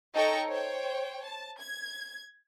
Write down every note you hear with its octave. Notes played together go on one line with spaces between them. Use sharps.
D#4 A4 C#5 G5 A#5 C#6
C5 C#5 G5
A5
G#6